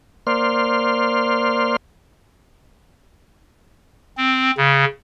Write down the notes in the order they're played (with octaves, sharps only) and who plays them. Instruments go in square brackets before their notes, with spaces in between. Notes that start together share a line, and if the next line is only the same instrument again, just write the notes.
[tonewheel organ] A#3 C5 D5 C6 F6
[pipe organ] C4
C#3